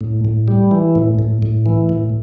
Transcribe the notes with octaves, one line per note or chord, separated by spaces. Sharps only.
A2
A2
G3
E3
A2
A2
A2
E3
A2